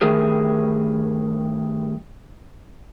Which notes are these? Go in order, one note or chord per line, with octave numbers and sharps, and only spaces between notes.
G2 D#3 A3 G#4 A#4